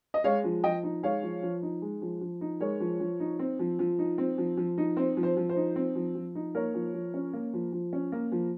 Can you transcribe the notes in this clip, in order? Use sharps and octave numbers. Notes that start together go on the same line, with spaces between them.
D#5
G#3 C#5 F5
F3
F3 D#5 G5
D#4
G#3 C#5 F5
F3
F3
D#4
G#3
F3
F3
D#4
G#3 A#4 C#5
F3
F3
D#4
C4
F3
F3
D#4
C4
F3
F3
D#4
C4 C5
F3
C5
F3
C5
D#4
C4
F3
F3
D#4
A#3 A#4 C#5
F3
F3
C#4
A#3
F3
F3
C#4
A#3
F3